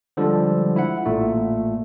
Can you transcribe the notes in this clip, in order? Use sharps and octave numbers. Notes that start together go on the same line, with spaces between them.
D3 F3 G3 G#3 A4
E4 E5 F#5
A1 A#2 A3